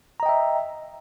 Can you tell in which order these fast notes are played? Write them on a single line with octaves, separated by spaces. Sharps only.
A#5 D#5 G5 E5